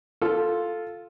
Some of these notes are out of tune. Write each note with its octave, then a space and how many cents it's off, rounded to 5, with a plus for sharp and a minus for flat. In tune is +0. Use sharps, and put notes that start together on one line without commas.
F4 +0 A4 +0 F5 +0